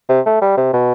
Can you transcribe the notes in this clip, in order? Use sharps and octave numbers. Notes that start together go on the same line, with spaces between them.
C3
A3
G3
C3
B2